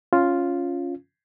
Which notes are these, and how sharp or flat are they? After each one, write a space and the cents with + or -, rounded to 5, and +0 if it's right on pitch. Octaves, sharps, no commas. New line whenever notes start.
C#4 +0 F4 +0